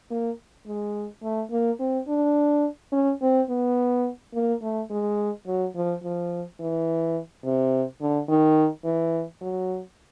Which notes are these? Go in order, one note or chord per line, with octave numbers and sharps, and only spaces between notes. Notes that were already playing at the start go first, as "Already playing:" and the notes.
A#3
G#3
A3
A#3
C4
D4
C#4
C4
B3
A#3
A3
G#3
F#3
F3
F3
E3
C3
D3
D#3
E3
F#3